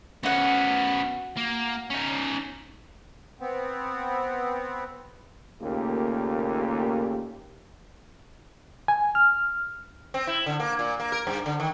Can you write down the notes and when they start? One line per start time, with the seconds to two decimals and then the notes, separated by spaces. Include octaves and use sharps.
0.23 B3 C#4 F#4 F#5
1.37 A#3
1.90 C#4 D#4
3.40 B3 C4
5.61 D#2 A#2 C#3 A3 A#3 G4
8.88 G#5
9.15 F6
10.14 C4
10.27 E4
10.46 D3
10.60 A#3
10.79 A#2
11.00 A#3
11.12 A#4
11.27 G2
11.46 D3
11.60 D#3